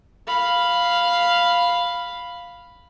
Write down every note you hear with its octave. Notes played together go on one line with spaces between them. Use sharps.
F5 B5